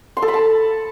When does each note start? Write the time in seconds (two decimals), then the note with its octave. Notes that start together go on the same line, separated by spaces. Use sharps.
0.17 C6
0.22 A4
0.28 B5
0.34 A5